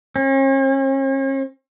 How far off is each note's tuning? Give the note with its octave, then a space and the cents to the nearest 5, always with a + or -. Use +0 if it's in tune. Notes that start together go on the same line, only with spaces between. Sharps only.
C#4 -45